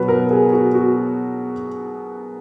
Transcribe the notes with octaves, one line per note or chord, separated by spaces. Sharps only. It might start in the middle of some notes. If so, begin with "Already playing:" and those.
Already playing: B2 F#3 B3 B4
A#4
G#4
F#4
F#4